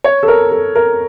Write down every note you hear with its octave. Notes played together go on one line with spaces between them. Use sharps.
C#5
A4
A#4
A4
A#4